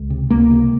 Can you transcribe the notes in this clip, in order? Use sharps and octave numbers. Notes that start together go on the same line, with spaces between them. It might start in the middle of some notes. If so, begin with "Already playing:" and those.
Already playing: C#2
C3
C#2 A#3
C3